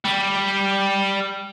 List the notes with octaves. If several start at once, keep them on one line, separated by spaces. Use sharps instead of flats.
G3